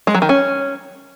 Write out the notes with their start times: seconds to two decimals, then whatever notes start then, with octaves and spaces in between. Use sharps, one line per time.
0.07 G#3
0.15 F#3
0.22 D#3
0.29 C#4